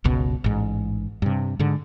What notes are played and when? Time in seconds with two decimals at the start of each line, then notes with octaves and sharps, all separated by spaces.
0.04 G1 C#2 B2
0.44 A1 G#2
1.22 G2 C3
1.59 G#2 D3